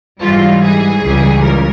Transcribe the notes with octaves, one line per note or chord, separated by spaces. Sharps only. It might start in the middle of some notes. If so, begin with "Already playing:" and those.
G#2 E3 G3 F4
G#4
C#2 C#3 E3 G3
A#4